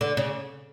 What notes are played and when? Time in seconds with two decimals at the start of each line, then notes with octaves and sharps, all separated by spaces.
0.01 D3
0.17 C#3